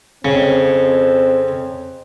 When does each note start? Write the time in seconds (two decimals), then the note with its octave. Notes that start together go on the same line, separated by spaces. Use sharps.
0.25 F2 C#3 C4